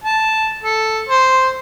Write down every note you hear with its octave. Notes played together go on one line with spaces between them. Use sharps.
A5
A4
C5